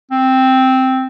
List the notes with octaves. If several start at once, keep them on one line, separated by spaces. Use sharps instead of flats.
C4